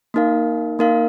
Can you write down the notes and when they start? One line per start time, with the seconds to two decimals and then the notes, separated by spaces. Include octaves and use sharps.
0.14 A#3 D#4 A#4 F5
0.79 A#3 D#4 A#4 F5